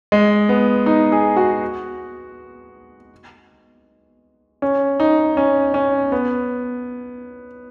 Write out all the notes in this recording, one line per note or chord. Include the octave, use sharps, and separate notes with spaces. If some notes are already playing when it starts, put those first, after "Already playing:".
G#3
B3
D#4
G#4
F#4
C#4
D#4
C#4
C#4
B3